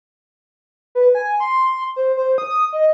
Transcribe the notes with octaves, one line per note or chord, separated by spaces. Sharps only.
B4
G#5
C6
C5
C5
D#6
D#5